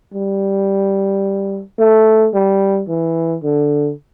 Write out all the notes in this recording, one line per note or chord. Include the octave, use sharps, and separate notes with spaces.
G3
A3
G3
E3
D3